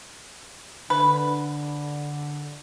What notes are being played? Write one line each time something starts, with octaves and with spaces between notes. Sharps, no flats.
D3 B4